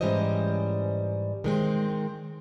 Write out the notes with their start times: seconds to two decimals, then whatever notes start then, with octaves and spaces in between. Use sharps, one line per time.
0.01 G#2 E3 G3 C#4 C5 D#5
1.44 D#3 G#3 C4